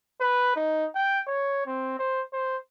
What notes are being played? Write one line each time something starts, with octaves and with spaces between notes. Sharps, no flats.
B4
D#4
G5
C#5
C4
C5
C5